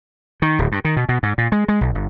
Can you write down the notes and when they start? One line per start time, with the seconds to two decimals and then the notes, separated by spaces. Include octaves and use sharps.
0.42 D#3
0.59 D1
0.72 G2
0.85 D#3
0.97 B2
1.09 B2
1.23 G#2
1.38 A#2
1.52 G#3
1.68 G#3
1.81 B1
1.95 G1